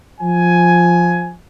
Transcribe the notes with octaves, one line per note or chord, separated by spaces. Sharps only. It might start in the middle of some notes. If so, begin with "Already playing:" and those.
F3 G#5